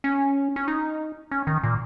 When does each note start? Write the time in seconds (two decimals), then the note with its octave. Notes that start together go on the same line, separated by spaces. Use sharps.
0.04 C#4
0.56 C#4
0.68 D#4
1.31 C#4
1.47 D#3
1.63 A#2